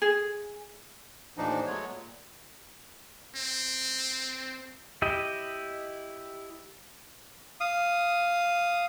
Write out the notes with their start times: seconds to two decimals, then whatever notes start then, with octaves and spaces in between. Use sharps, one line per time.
0.02 G#4
1.38 D#2 A2 E3 F3 D4 D#4
1.66 F#3 G#3 A3 B3 C#5
1.93 A#2
3.36 C4
5.02 E4 G4 D#5
7.60 F5 D#6